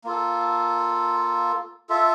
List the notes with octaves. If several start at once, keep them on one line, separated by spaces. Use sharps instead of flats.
A#3 F4 A4
F4 A4 E5